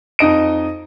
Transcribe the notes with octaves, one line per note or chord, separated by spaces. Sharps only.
F2 D#4 D#5 D7